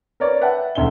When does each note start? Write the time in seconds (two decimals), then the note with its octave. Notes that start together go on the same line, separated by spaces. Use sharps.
0.20 A#4 B4 C#5 D5
0.41 B4 E5 F#5 G5 A5
0.75 E1 D2 E5 G7